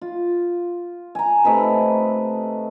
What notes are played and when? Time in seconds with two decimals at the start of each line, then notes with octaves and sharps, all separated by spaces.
0.01 F4
1.15 G#5 A#5
1.44 C3 A3 D#4 B4